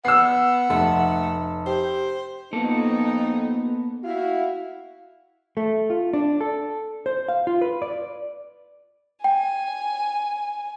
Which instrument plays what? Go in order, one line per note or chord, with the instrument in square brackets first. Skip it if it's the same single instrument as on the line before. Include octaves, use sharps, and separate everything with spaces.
[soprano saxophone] B3 [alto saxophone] F#5 [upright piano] E6 C7
[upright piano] F1 [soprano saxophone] A3
[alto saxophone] G4 [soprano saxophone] C5
[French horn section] F2 D#4 [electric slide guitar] A#3 A4 [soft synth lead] B3
[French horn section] E4 F#4 [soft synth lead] F5
[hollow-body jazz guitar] A3
F4
D4
A4
C5
F5
F4
B4
D5
[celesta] G5 [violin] G#5